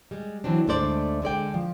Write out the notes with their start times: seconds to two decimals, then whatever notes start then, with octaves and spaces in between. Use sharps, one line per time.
0.11 G3 G#3
0.44 E3 F#3 C4 D4
0.67 D2 G#2 A3 D4 C5 D5
1.22 D3 G#3 D5 G5
1.54 F3